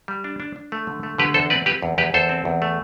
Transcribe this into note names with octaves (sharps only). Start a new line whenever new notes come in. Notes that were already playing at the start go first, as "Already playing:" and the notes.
G3
D4
D4
D4
A3
D3
A3
D3 G4 B4
E2 A4 C5
C4 B4 D5
C4 G4 B4
E2
E2 G4 B4
E2 A4 C5
C4
E2
A3